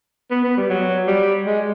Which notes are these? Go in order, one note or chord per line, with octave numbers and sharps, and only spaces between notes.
B3
B3
G3
F#3
G3
G#3